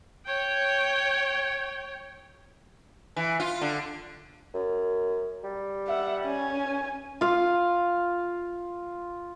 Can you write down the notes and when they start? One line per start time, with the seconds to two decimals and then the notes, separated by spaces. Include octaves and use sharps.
0.26 C#5 G5
3.16 E3
3.40 F4
3.61 D3
4.54 F#2
5.43 G3
5.88 E5 F#5
6.25 C#4 G#5
7.21 F4 F5